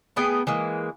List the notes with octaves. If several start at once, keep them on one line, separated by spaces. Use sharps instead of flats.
A3 B3 G#4 G5
E3 G#3 A#3